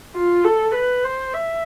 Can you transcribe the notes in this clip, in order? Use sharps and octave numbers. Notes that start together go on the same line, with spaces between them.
F4
A4
B4
C5
E5